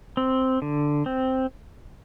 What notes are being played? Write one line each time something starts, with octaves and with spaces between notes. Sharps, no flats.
C4
D3
C4